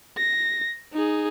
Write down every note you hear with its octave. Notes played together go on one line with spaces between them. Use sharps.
A#6
D#4 G#4